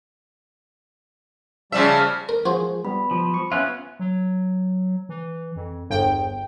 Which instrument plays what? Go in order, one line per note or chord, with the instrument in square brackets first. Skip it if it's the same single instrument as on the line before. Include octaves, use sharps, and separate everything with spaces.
[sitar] C#3 F3 E5 [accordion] G3 D5 A5
[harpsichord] A#4
[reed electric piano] F3 G#3 G#4 [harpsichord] F#4 C5
[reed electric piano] G3 B3 [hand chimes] B5
[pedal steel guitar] F3
[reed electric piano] C#6
[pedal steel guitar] B3 C#4 F4 [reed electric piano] E5 [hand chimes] F#6
[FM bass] F#3
E3
F2
[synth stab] G1 G5 [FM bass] E2